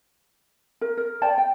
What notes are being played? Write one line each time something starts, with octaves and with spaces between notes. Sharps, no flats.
A#4
A#4
C5 D5 G5 A5
G5